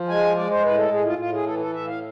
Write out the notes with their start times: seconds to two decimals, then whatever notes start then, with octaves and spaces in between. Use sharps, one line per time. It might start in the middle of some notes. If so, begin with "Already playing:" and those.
Already playing: F3
0.08 G#3 G#5
0.36 G#3 D5
0.50 C5
0.63 A2 B4
0.77 A4
0.91 A2 G#4
1.05 F4
1.18 A2 F4
1.32 G#4
1.46 E3 A4
1.59 A4
1.73 A2 E5
1.87 F5